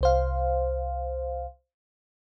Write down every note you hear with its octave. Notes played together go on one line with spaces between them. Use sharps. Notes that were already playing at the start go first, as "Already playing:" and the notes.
C2 C5 F5